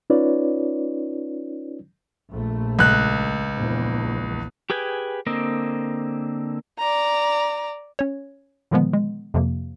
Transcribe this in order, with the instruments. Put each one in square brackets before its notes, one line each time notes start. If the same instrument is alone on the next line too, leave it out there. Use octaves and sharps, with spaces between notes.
[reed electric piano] C#4 D#4 F4 B4 C#5 D5
[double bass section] A#1 A3
[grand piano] C#2 F#6
[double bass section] A#1 E2
[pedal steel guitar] G4 G#4 B4 G5 G#5
D3 A#3 C4 D#5
[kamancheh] D5 A#5
[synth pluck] C#4 C#5
A#2 D3 D#3 F3 G#3 B3
G#3
F2 C3 F3 A#3